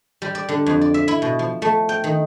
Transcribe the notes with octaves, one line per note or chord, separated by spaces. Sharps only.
G3
D5
D3
F2
D5
E5
E4
B2
F3
A3
G5
D#3